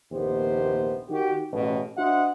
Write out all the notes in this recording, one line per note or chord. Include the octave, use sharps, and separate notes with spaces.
A#1 D#2 C3 B3 G4 C5
D#3 F#4 G4
A1 E2 B2
D4 F#4 C5 D#5 E5 F#5